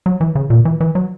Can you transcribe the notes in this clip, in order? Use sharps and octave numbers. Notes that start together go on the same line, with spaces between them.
F#3
E3
C#3
A#2
E3
E3
F#3